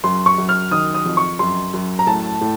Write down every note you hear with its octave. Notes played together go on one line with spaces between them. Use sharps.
F#2 C6
C#6
F#2
F6
D#3 D#6
D#6
F2
C#6
F#2 C6
F#2
A#5
A2 A5
A2